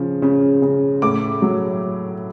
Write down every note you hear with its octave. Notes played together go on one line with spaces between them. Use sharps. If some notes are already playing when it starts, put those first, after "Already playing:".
Already playing: C#3 F3
C#3
C#3
A2 D6
F#3